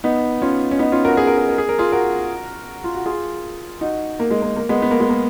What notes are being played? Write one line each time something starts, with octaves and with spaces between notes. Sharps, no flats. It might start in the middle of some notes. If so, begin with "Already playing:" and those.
B3 D#4
C#4 F4
C#4
B3 D#4
C#4 F4
F#4 A#4
G#4
A#4
G#4
A#4
G#4
A#4
F4 G#4
F#4 A#4
F4
F#4
F4 G#4
D#4 F#4
A#3
G#3
A#3
A#3
G#3 B3
B3
A#3
G#3
A#3